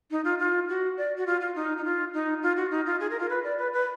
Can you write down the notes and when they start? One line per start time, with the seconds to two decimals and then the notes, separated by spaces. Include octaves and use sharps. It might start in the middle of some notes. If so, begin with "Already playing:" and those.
0.11 D#4
0.25 F4
0.39 F4
0.69 F#4
0.97 D5
1.17 F#4
1.27 F4
1.41 F4
1.55 D#4
1.78 D#4
1.85 F4
2.14 D#4
2.42 F4
2.57 F#4
2.71 D#4
2.86 F4
3.00 G#4
3.10 A#4
3.19 F4
3.30 B4
3.44 D5
3.58 B4
3.73 B4